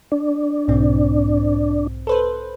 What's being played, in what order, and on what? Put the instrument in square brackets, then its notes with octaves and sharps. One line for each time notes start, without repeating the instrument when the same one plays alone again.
[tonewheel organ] D4
[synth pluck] B1 G#2 C4
A4 B4 C5